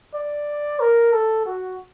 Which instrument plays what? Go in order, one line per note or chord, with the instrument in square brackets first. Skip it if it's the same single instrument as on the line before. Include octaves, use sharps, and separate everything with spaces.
[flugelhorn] D5
A#4
A4
F#4